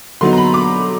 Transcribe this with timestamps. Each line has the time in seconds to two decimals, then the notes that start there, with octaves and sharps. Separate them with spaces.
0.21 D3 F#3 B3 D#4 C6
0.33 A#5
0.37 B5
0.54 D6